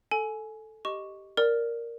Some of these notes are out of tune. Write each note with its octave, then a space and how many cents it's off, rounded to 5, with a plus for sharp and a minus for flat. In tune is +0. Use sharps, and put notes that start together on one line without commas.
A4 +0 G#5 +20
G4 -5 D#5 +0 C#6 +0
A#4 +0 D5 +0